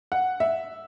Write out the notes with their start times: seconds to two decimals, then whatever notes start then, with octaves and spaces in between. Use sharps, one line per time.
0.12 F#5
0.40 E5